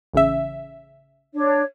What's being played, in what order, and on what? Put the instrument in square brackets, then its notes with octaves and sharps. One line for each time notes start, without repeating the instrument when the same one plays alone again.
[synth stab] A1 C#3 E5
[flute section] D4 C#5